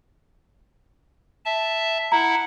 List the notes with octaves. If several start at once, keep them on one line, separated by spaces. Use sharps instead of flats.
E5 A5
E4 F#5 A#5